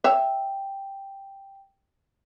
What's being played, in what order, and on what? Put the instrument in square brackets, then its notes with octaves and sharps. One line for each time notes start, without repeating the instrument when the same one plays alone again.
[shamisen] C#5 E5 [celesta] G5